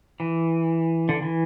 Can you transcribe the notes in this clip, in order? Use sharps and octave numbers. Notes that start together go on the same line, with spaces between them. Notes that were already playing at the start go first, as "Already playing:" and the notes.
E3
D3
E3